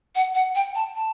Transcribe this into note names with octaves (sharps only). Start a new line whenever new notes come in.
F#5
F#5
G5
A5
A5